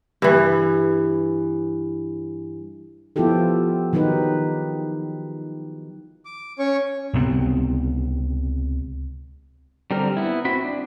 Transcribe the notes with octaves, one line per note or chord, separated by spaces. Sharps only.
G2 E3
F3 B3 E4 F4 G4 A4
D#3 F#3 D#4 G4 B4
D6
C#4 C#5 C#6
C#2 C3 B3 C4
D3 G3 C4 A#4
B3 E4
C4 F#4 B5
D4